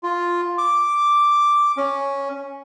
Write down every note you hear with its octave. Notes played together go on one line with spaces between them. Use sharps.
F4
D6
C#4